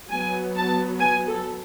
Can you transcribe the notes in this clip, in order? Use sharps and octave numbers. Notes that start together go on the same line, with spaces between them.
F#3 B3 G#5
A5
G#5
A4